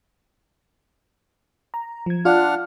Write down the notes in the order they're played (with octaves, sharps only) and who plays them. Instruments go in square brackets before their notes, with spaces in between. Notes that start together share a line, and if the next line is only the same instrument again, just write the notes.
[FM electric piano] A#5
F3 G#6
[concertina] D4 F#5 F6 [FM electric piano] F4 D5